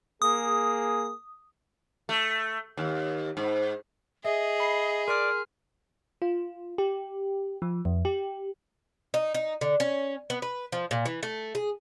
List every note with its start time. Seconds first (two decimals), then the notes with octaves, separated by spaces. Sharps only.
0.22 A#3 G#4 D#6
2.09 A3
2.77 D#2
3.37 G#2
4.24 G#4 D#5 E5
4.60 B5 C7
5.08 A#4 D5 C6 F6
6.22 F4
6.78 G4
7.62 F3
7.85 F2
8.05 G4
9.14 D#4
9.35 D#4
9.61 D3
9.80 C#4
10.30 B3
10.42 B4
10.72 F3
10.91 A#2
11.06 E3
11.23 A3
11.55 G#4